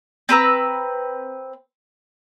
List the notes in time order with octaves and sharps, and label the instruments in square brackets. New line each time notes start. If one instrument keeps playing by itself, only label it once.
[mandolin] C4 B4 A#5 E6